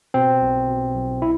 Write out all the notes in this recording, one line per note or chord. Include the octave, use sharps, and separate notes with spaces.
B2 C4
B1
B2
B1
E4